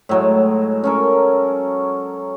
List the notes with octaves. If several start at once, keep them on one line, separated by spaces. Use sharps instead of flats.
A2 F#3 G#3
C#4 A4 A#4